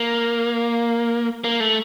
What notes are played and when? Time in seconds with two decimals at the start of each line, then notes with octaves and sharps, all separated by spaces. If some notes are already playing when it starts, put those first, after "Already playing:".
Already playing: A#3
1.44 A#3
1.60 A3